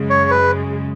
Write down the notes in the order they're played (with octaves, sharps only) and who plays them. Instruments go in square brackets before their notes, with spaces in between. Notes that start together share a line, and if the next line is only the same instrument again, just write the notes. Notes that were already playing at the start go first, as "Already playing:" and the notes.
Already playing: [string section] F#2 C#3 G#3
[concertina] C#5
B4